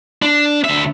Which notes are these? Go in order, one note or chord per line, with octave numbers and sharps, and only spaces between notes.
D4
D2 E5